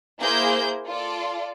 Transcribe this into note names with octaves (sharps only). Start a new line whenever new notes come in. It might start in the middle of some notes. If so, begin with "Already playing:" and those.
A#3 E4 G#4 A#4 C5 G6
F4 A4 D5